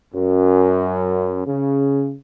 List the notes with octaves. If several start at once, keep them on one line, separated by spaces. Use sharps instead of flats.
F#2
C#3